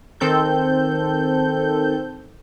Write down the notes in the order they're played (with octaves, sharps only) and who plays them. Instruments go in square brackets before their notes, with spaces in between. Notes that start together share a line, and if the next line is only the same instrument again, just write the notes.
[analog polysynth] D#3 C4 A4 G6